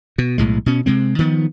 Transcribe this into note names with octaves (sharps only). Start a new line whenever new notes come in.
B2
B1 A2 G#3
B2 C#4
C3 G#3 C4
D#3 F3 B3